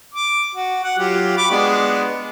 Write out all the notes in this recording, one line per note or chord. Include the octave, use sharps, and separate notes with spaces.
D6
F#4
F#5
F#3 F4 G4
B5 C#6 D6
G#3 B3 D4